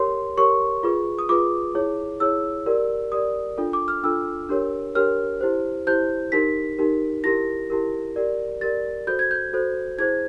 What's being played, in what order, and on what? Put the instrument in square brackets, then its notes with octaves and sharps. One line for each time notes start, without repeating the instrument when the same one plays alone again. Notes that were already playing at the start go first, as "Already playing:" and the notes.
Already playing: [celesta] G4 A#4 C#5 C6
G4 A#4 C#5 C#6
F4 G#4 B4
D#6
F4 G#4 B4 D6
E4 G#4 C#5
E4 G#4 C#5 E6
G4 A#4 D5
G4 A#4 D5 D#6
D4 F4 A4
D6
F6
D4 F4 A4 E6
D4 G4 A#4 C#5
D4 G4 A#4 C#5 F6
E4 G4 C5
E4 G4 C5 G6
D#4 G4 A#4 B6
D#4 G4 A#4
E4 G4 A#4 A#6
E4 G4 A#4
G4 A#4 D5
G4 A#4 D5 A6
F#4 A4 C5 G6
G#6
G6
F#4 A4 C5
E4 G#4 C5 G#6